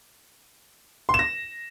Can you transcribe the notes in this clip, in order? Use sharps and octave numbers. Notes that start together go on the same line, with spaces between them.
C6
E7
A#6